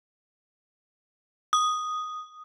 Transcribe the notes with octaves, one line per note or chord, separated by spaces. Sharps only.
D#6